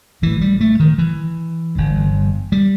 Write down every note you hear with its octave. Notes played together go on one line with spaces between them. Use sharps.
A1 A2 E3
G3
A3
D#3
E3
G1 G2
G3